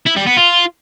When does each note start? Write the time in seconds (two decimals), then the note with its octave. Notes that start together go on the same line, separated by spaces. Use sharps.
0.06 E4
0.17 G3
0.27 B3
0.37 F4